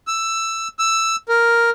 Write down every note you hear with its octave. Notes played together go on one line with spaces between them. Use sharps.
E6
E6
A#4